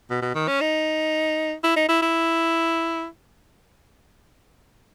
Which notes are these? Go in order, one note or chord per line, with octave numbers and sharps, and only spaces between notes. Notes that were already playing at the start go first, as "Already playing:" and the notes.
B2
B2
D#3
C#4
D#4
E4
D#4
E4
E4